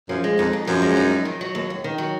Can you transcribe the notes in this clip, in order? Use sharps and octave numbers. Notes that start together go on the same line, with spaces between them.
F#2 F3
G#3
F2 D#4
F2
F#2 F3
G#3
D#4
F2
D#3
F#3
D#2
D#2
D#3
F#3